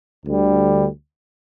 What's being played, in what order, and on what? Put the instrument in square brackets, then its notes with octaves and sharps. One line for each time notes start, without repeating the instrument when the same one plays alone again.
[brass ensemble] D2 D3 G3